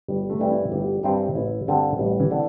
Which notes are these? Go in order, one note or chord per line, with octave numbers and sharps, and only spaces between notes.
G1 G3
A3
G2 E3 G3 C4
E4
G1 G4
G2 E3 G3 C4
A1 E4
G2 D3 C4
A1 G3
E3
D3 C4